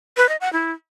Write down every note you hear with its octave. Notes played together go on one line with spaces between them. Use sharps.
B4
D#5
F#5
E4